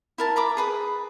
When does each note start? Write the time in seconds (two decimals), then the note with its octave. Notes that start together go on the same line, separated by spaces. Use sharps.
0.18 E4 A#4 A5
0.36 E5 A#5 B5 D6
0.57 G#4 B4 D#6